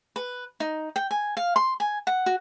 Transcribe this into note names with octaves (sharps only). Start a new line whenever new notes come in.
B4
D#4
G5
G#5
F5
C6
G#5
F#5
F#4